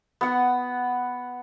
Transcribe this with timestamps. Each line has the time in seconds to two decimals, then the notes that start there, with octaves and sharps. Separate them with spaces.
0.21 B3 F#5